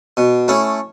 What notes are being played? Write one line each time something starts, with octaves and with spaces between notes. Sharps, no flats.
B2
A3 C#4 E4